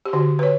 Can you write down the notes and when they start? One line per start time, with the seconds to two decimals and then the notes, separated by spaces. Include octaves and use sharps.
0.06 G4
0.13 D3 F#4
0.39 B4
0.43 C#5